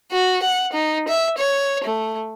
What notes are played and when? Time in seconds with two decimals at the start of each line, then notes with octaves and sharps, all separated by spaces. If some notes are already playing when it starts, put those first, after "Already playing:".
0.12 F#4
0.43 F#5
0.73 D#4
1.08 E5
1.38 C#5
1.84 A3